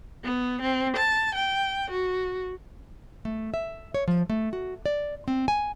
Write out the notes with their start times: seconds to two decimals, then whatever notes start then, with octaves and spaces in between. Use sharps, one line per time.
0.24 B3
0.62 C4
0.97 A5
1.35 G5
1.91 F#4
3.25 A3
3.54 E5
3.94 C#5
4.08 F3
4.30 A3
4.53 F#4
4.86 D5
5.28 C4
5.48 G#5